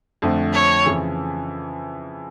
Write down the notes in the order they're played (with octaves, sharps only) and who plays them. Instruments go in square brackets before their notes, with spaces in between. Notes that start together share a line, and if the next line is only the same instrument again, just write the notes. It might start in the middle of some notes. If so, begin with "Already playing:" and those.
[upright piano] F2 D3 F3 A3
[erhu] C#5
[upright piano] F2 C#3 E3